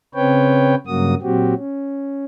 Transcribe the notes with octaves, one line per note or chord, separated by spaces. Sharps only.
C#3 C4 B4 C#5 G5
G2 C#3 F#3 A#3 F#4 D#6
A#2 F#3 C4 F#4 G4
C#4